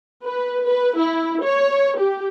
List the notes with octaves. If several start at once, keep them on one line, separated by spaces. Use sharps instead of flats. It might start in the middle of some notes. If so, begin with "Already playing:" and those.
B4
B4
E4
C#5
G4